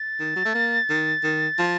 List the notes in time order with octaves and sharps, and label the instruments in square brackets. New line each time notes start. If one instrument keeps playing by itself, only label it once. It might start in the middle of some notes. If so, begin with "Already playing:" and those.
Already playing: [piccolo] A6
[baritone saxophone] D#3
F#3
A3
A#3
D#3
D#3
F3